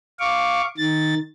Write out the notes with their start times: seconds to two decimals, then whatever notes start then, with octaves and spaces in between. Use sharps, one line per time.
0.19 F5 C#6 D6
0.77 D#3 A6